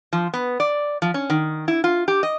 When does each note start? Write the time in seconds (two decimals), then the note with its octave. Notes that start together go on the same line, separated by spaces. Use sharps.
0.13 F3
0.34 B3
0.60 D5
1.02 F3
1.14 C#4
1.30 D#3
1.68 E4
1.84 F4
2.08 G4
2.23 D#5